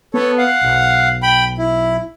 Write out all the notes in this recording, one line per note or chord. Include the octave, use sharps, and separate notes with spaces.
B3 A4 C#5
F5 F#5
B1
G5 B5
E4